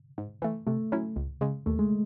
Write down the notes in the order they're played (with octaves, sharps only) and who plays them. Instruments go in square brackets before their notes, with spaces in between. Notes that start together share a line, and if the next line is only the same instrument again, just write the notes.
[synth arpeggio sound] G#2
E3 A3
[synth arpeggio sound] C3 [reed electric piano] A3
[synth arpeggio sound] F#3 C#4 E4
C#2
C#3 G#3
[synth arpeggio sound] D#2 [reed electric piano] A3
[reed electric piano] G#3